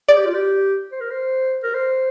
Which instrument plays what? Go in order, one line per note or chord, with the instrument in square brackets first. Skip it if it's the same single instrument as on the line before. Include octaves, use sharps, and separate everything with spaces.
[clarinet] G#4 [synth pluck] D5
[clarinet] G4
F4
G4
C5
A#4
C5
A#4
C5